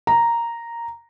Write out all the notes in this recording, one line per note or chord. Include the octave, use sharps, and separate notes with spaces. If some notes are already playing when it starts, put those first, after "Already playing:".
A#5